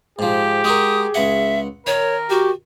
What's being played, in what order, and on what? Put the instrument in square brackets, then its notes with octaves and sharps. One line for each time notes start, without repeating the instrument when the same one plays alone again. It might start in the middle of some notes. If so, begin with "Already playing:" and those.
[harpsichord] G#2 F3 [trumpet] G4 [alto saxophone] G#4
[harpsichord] G#3 F#4 A#4 [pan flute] D#6
[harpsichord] C#2 F#5 [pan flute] E5
[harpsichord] D#3 [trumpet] A#4 [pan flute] C#5
[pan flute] F#4 [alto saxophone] G4